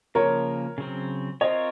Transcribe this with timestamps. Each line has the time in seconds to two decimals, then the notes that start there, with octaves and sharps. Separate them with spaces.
0.15 C#3 F3 A#3 A#4 C#5
0.78 C#3 F#3 C4
1.41 C4 F4 A#4 C5 C#5 D#5